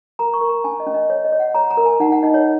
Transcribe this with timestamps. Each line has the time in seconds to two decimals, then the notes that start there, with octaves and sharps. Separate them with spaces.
0.19 A#4 A#5
0.34 C#6
0.41 A#4
0.49 A#5
0.64 C#4 G#5
0.80 D#5
0.87 C#4
0.94 D#5
1.10 C#5
1.25 D#5
1.32 C#5
1.40 F#5
1.54 C#5 A#5
1.71 A#5
1.77 A#4
1.86 G#5
2.00 D#4 F#5
2.12 F#5
2.23 D#4 D#5
2.34 C#5